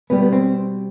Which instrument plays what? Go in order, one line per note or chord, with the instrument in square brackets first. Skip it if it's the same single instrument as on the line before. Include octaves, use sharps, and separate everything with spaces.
[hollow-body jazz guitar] B2 G3 B3
B3
C4